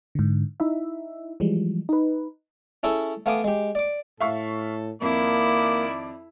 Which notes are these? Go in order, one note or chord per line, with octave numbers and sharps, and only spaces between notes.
G#2 D3
D#4 E4 E5
E3 F3 G3 G#3
D#4 B4
C#4 E4 G#4 A4 C#5
A3 B3 F5 G#5 D6 D#6
G#3 G4
D5 D6
A2 A4 E5 F5 C#6
F2 D#3 A#3 E4 D5 D6